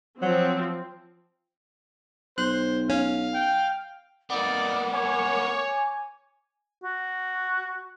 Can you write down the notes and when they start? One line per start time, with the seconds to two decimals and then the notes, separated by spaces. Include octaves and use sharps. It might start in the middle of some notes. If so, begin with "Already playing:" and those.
0.22 F3 F#3 C4
2.38 B1 C5 F#6
2.89 C#4 F5
3.34 G5
4.30 A#3 B3 D#4 D5 D6
4.93 C#5 G#5
6.83 F#4